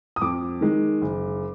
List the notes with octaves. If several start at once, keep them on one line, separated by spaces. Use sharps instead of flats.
D#6
F2 D6
D#3 G#3
F#1